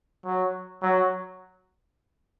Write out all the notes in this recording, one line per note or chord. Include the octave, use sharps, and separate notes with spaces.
F#3
F#3